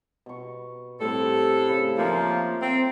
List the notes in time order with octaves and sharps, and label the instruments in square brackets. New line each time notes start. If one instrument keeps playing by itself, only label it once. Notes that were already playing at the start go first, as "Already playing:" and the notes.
[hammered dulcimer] B2 C#6
[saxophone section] A2 A4 [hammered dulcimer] G3 C4
[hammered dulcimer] C#3 B5
[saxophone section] F3 A#3 [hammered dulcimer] A3 D#4 F4
[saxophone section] C4